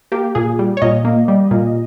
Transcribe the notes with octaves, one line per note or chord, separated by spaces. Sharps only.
A#3 G4
A#2 G#4
G3
C#5
A#2 D#5
A#3
G3
A#2